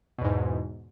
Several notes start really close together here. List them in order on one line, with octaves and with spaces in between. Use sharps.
B2 E2 G#2